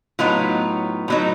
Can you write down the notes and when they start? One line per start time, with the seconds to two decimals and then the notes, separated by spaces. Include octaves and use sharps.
0.19 A2 F#3 B3 D#4 F4
1.08 A2 F#3 B3 D#4